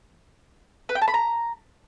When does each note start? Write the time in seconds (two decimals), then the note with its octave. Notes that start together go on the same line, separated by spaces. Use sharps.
0.89 B4
0.95 G5
1.01 A5
1.08 B5
1.14 A#5